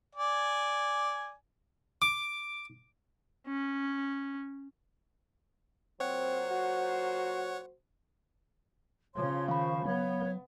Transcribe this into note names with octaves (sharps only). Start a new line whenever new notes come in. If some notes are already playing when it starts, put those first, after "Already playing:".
D5 G#5
D6
C#4
A#2 F#3 C4 C5 C#5 F#5
F#4
C#3 F3 C#5 C6
D#3 C5 F5 B5 C#6
F#3 B3 C#5